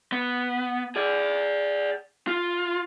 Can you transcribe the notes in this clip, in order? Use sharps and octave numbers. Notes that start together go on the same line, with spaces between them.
B3
G#4 D5
F4